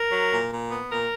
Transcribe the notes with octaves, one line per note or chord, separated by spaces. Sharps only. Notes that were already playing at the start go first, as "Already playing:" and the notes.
Already playing: A#4
F#3
A#2
A#2
B3
A#2 A#4